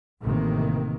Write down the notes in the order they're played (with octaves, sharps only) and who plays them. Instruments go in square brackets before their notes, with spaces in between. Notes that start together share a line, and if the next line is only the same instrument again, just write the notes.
[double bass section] A1 C3 D#3 A#3